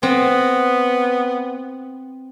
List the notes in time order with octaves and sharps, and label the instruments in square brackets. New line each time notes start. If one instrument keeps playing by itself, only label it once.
[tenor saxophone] B3 [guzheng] C4